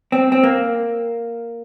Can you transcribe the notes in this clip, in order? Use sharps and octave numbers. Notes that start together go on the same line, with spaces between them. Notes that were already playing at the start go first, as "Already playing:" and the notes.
C4
C4
A#3